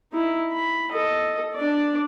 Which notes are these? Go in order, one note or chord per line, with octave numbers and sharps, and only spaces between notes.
D#4 E4
B5
A4 D#5
D4 D5